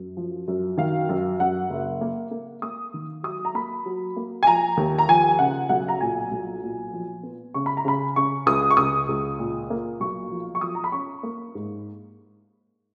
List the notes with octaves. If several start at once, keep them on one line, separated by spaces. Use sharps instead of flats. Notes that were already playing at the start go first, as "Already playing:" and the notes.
Already playing: F#2
F3
F#2
D#3 F5
F#2
F#2 F#5
F#1
A#3
A#3
A#3 D#6
D#3
F#3 D#6
A#5
A#3 B5
F#3
A#3
G#5
F3 A#5
D#2
A#5
F3 G#5
C#3 F#5
B1 F#5
A#5
A#2 G#5
B1
A#2
F3
B3
C#3 C#6
B5
A#5
C#3 B5
C#3 C#6
C#2 D#6
C#6
C#2 D#6
C#2
A#2
A#3
B1 C#6
F3
C#6
F3 D#6
A#5
B5
C#4 C#6
A#3
G#2